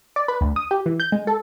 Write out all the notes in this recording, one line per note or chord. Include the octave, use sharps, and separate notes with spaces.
D5
B4
D2
D#6
G4
E3
G6
G#3
A4